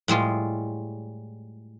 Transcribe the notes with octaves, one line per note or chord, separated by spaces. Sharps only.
A2 G3 G#3 F4